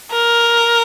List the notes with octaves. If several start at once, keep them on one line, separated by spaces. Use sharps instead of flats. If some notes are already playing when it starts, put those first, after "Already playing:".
A#4